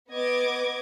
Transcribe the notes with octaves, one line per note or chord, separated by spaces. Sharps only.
B3 D#5 D6 G#6